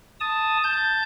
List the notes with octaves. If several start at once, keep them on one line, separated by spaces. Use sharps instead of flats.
A5 D#6
A5 G6